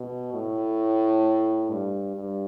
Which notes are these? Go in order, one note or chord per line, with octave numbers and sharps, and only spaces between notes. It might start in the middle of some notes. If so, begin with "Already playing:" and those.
Already playing: B2
A2
G2
G2